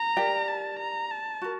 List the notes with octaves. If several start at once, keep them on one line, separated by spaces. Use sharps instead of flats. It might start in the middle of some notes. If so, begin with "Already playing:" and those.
Already playing: A#5
G4 A#4 D5 G5
A5
A#5
A5
F#4 A#4